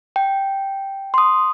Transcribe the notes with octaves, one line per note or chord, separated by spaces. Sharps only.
G5
C6 D#6